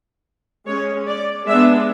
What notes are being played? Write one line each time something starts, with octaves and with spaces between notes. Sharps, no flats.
G#3 C#4 C#5
D5
G#3 B3 D4 E5